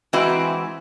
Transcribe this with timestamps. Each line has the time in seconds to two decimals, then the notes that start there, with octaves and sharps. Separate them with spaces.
0.13 E3 G#3 C4 E4 F#4 B4